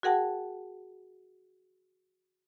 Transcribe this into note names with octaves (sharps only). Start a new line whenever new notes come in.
F#4 G#4 A#4 F#5 G5 A5